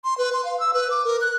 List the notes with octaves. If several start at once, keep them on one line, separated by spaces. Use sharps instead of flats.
C6
B4
C6
F5
E6
B4
D6
A#4
F#6